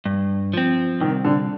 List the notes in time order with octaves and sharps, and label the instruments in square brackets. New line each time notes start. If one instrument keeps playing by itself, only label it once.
[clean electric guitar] G2
F3 C4
[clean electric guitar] C2 [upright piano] D#3
[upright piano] D3